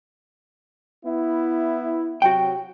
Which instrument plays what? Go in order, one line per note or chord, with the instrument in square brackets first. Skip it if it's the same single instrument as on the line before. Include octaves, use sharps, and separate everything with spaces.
[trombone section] B3 E4
[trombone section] C3 F#3 [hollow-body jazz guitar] F#4 G5